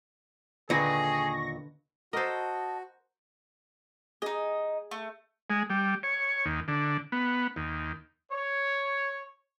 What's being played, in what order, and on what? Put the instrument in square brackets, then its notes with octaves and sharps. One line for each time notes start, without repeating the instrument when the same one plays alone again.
[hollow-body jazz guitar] D#2 A#2 [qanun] D3 B4 [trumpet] G#4 [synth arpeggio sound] C#6 A#6
[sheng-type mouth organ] F#4 [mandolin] A4 D#5 [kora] A#4 C5
[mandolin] D#4 D#5 [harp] G#4
[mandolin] A3
[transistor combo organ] G#3
G3
C#5
D#2
D3
B3
D#2
[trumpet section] C#5